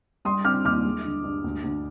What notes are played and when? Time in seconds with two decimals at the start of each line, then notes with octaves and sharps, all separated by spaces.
0.25 G3 C6 D#6
0.45 C4 D6 F6
0.65 D#2 D6 F6
0.85 G#3
1.05 D3
1.24 G2
1.44 D2
1.64 D2